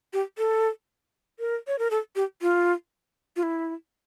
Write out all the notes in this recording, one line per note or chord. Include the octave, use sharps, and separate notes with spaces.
G4
A4
A#4
C#5
A#4
A4
G4
F4
F4
E4